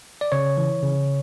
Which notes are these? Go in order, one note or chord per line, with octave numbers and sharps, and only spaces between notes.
D5
C#3 C#5
E3
C#3